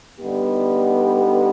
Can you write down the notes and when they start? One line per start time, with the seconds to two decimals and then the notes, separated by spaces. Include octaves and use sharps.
0.20 D3 G3 B3 D#4 G4